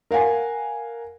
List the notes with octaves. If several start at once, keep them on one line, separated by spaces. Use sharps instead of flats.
A#4 F5 F#5 G#5